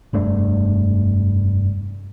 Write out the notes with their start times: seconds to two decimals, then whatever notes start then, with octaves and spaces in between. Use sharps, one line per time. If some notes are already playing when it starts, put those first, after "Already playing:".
0.13 F1 G2 A3 D4